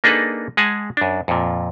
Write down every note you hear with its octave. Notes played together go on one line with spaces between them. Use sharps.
A#3 D4 D#4 G#4 A4 B4
G#3 G#4 F#5 G#5 A5
F#2 D4
F2 A#2